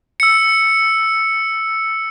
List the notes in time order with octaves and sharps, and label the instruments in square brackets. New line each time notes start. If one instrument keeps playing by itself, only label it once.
[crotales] E6 C#7